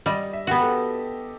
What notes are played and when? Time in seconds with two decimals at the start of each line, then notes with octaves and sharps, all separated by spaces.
0.06 G3 D#5
0.33 E5
0.47 B3 F#4 G4
0.61 A4